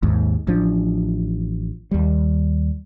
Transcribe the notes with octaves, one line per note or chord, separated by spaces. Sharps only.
G#1 D#2 G#2
A1 F3 D4
D#2 G3